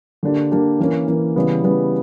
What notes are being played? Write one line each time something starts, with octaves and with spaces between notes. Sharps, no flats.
D3 A#3 D4 G4
D3 A#3 D4 G4
E3 A#3 C#4
E3 A#3 C#4
C#3 E3 G3 B3
C#3 E3 G3 B3